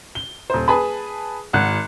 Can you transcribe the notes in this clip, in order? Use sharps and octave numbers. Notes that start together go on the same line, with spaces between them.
G7
D#1 C5
G#4 B4 A5 B5
G#1 F#5 F#6